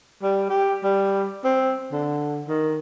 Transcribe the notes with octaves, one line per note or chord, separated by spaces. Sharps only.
G3
G4
G3
C4
D3
D#3